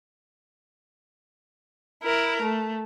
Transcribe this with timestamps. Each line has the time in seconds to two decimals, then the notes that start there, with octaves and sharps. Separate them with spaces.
2.03 E4 A#4
2.42 A3